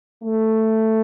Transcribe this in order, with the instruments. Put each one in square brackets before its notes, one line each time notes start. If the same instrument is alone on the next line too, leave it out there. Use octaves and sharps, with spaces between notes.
[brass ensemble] A3